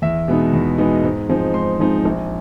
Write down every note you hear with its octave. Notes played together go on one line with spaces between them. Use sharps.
E2 E5
B2 G#3 B3 D#4
E2
B2 G#3 B3 D#4
G#2
F3 G#3 C4 D#4
G#2 C6
F3 G#3 C4 D#4
A#1